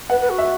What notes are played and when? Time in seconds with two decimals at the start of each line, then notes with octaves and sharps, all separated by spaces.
0.10 B4 F#5
0.20 B4
0.30 F#4
0.38 E5